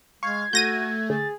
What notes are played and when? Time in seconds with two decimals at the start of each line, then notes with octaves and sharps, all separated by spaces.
0.23 G#3 F5 C#6 G#6
0.53 A3 F#4 G6 A#6 D#7
1.10 D3 G#4 A6